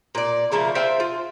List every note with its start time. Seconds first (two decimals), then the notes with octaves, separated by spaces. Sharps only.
0.15 A#2 D5
0.52 C#3 F3 A3 A#3
0.75 F4 C5 E5 G5
1.00 F4